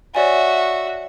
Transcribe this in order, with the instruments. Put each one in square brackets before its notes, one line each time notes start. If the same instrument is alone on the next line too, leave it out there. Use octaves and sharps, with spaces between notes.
[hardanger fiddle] F#4 E5 [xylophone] C#5 D5 G#5